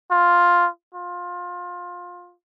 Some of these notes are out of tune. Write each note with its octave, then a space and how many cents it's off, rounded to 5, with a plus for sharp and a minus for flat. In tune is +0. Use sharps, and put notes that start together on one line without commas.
F4 +5
F4 +20